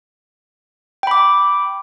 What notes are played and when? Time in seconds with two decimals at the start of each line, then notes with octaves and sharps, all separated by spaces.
1.03 G5
1.07 B5
1.11 D6